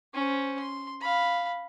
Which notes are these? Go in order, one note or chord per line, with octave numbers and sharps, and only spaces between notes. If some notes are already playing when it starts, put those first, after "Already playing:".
C#4 C5
C6
F5 B5